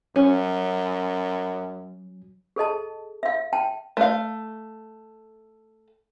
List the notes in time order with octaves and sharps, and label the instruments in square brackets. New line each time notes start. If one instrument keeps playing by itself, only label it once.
[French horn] F#2 [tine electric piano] F#3 [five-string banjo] C#4
[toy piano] G#4 A4 D#5 A5
E5 F5
G5 A5
[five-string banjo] A3 F5